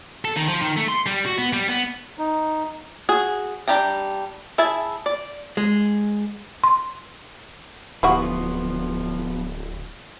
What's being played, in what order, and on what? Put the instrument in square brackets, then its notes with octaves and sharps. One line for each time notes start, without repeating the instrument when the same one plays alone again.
[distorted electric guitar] A4
D#3
F3
D#3
A3
C6
G3
F#4
B3
G3
B3
[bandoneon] D#4
[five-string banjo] F#4 G#4
G3 D4 G4 G5 A#5
E4 G#4 E5 A5
D5
[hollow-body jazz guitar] G#3
[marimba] C6
[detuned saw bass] D1 [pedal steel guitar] F3 B3 [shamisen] G3 E4 F#4